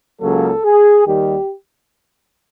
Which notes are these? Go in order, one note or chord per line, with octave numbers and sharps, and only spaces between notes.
C#2 C#3 F#3 A#3 A4
G#4
D#2 D#3 G3 G4